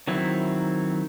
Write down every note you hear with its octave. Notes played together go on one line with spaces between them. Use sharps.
D#3 F#3 C4 E4